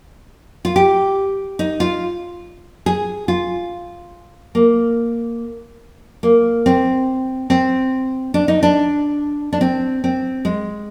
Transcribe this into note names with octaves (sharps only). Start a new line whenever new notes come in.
F4
G4
D#4
F4
G#4
F4
A#3
A#3
C4
C4
D4
D#4
D4
D4
C4
C4
G#3